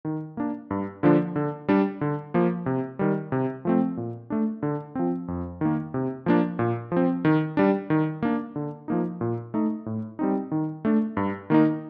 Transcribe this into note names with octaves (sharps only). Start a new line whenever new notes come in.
D#3
A#3 D4
G2
D3 F3 A#3 D4
D3
G3 D4
D3
F3 A#3
C3
D#3 G3
C3
F3 A3 C4
A#2
A3 D4
D3
F3 C4
F2
D#3 A#3
C3
F3 A#3 D4
A#2
F3 C4
D#3
G3 D4
D#3
A#3 D4
D3
F3 A#3 D#4
A#2
A3 D#4
A2
G3 C4 D#4
D#3
A3 D4
G2
D#3 A#3 D#4